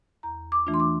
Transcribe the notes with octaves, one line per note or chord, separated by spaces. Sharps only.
E2 A#5
D6
E3 A3 D4 F4
C6
D6